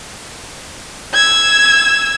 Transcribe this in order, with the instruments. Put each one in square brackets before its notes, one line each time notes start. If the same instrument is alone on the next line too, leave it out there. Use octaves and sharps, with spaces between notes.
[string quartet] E6 G#6